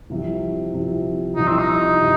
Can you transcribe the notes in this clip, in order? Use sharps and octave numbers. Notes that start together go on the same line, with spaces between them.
C2 C3 F3
C2 C3 F3
C2 C3 F3 D#4
C4
D#4
C3